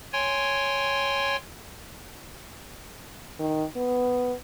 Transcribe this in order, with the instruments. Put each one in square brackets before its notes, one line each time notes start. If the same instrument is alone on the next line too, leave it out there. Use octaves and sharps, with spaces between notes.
[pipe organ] C#5 G5 G#5 C6
[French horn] D#3
B3